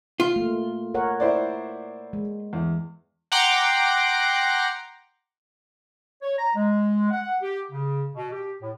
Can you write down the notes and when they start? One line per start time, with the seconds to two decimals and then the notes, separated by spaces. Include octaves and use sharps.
0.20 F4
0.36 A3 A#3
0.94 A#4 C#5 F#5
1.20 E4 C5 D5
2.13 G#3
2.53 E2
3.32 F#5 G5 A#5 C6 D6
6.22 C#5
6.38 A#5
6.55 G#3
7.11 F#5
7.42 G4
7.71 C#3
8.16 B2
8.31 G4
8.62 A2